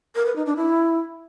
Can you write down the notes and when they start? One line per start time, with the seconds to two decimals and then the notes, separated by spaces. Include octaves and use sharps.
0.15 A#4
0.25 B4
0.36 D#4
0.46 D4
0.56 E4